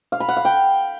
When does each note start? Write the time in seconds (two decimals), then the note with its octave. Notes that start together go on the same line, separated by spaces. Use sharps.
0.12 F5
0.20 B5
0.28 F#5
0.37 F5
0.45 G5